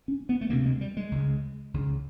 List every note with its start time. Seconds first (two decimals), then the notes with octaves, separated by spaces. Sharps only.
0.08 C#4
0.29 B3
0.41 A3
0.49 D2 A#3
0.53 C3
0.65 G#3
0.81 G3
0.97 G#3
1.12 C#2 C#3
1.74 C#2 C#3